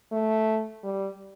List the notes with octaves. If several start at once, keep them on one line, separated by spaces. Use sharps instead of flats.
A3
G3